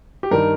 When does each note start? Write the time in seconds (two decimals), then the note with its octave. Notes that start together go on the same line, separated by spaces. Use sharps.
0.23 G4
0.31 G2 D#3 G3 D#4 A#4